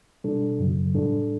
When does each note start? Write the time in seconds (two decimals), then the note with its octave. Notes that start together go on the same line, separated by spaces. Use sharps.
0.24 B2 G3 D4 A4
0.59 F#2 C#3 F#3
0.94 A2 G3 D4 A4